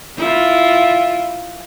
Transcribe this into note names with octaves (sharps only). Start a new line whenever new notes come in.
E4 F4